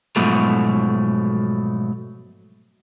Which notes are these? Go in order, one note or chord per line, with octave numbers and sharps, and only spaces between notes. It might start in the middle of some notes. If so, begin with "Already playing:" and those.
G#2 B2 F3 F#3 A3